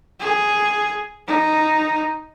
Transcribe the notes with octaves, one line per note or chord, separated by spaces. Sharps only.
G#4
D#4